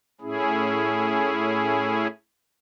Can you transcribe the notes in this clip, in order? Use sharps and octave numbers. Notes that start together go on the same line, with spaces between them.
A2 C#4 E4 G#4